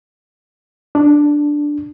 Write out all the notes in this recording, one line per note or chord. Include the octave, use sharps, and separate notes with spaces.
D4